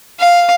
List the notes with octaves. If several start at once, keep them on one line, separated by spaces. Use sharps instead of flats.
F5